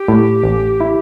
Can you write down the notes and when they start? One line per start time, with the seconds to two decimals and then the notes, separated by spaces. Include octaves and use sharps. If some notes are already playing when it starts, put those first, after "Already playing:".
Already playing: G4
0.08 A2
0.43 A1
0.80 E4